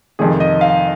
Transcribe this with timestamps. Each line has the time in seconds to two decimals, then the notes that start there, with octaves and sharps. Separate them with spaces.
0.19 F2 C3 D#3 G#4
0.40 D#5
0.61 F5